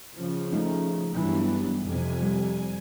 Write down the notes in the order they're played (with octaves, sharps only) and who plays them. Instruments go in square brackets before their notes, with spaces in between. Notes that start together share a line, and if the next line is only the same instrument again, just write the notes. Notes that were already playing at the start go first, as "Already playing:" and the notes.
[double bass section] C#3 F3 [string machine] C#4
[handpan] G#3 A3 D#4
[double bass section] G2 E3 F#3 [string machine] G3 B3 D4
[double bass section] F2 C3 [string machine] G#5
[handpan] G3